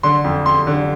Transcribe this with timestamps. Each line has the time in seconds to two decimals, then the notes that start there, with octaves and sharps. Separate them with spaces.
0.03 D3 C6
0.24 F2
0.46 F2 C6
0.67 D3